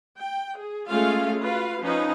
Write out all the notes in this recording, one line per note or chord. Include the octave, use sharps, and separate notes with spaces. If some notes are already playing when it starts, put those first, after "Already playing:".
G5
G#4
G#3 A3 C#4 F4 F5
F4 F#4 B4 F5
F3 C#4 D#4 B4